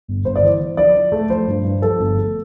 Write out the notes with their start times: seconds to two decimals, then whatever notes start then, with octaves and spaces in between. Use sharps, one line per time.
0.08 G1
0.25 G1 C5
0.36 D5
0.43 E3 C5
0.60 E3
0.77 F3 D5
0.95 F3
1.12 A3
1.30 F3 C5
1.47 G2
1.65 G2
1.82 F3 A4
1.99 G1
2.17 A3